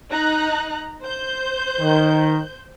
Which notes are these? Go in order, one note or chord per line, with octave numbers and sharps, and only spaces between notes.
D#4 A#5 F#6
C5 G6
D#3